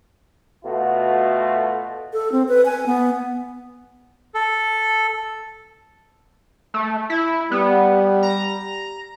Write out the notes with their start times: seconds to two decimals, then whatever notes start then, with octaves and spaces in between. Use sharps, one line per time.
0.63 B2 A3 F4 F#4
2.13 A4
2.32 C4
2.48 B4
2.65 G#5
2.86 B3
4.34 A4
6.74 A3
7.10 E4
7.51 G3 B3
8.23 A#5